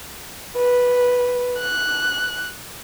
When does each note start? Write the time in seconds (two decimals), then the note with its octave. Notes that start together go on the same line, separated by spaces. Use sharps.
0.57 B4
1.60 F#6